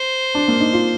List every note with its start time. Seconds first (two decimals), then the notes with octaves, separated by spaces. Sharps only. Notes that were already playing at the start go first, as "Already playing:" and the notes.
Already playing: C5
0.35 D4
0.48 A#3
0.60 D#4
0.73 F4